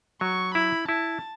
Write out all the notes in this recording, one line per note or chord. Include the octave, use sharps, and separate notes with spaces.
F#3 C#6
E4 B5
E4 A5